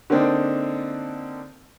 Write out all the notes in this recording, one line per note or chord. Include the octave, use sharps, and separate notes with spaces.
D3 A#3 C4 D4 D#4